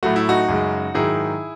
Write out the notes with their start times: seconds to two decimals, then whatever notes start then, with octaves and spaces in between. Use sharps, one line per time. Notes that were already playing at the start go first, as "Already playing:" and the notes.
0.03 A2 F#3 A3 F#4
0.16 E4
0.29 D#4 F#4
0.48 F#2 C#3 G#3
0.94 G#2 D#3 F#3 E4 G#4